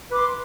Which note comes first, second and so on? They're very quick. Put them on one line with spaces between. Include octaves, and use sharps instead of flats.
B4 D6 C6